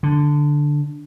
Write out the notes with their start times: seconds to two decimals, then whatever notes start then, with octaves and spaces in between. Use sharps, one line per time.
0.03 D3